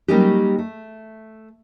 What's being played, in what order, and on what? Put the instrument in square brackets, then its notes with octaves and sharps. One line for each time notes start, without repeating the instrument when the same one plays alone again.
[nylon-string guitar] F#3 G3 A#3 C#4 D#4 G4
A3